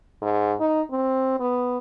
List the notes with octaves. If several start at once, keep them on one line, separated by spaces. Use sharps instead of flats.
G#2
D#4
C4
B3